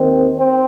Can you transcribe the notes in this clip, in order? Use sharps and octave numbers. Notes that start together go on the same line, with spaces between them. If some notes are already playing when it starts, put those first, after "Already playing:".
Already playing: D#2 D#3 C4
C4